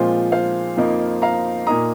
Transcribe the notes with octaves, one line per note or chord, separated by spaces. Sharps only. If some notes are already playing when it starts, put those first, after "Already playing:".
Already playing: A#2 F3 G#3 C4 F4 C5
C5 F5
F2 F3 A#3 D#4
F5 A#5
A#2 A#3 D#4 A#5 D#6